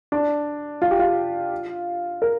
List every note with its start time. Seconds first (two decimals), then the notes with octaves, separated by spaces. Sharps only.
0.12 D4
0.82 F4
0.91 G4
0.99 F4
2.22 A#4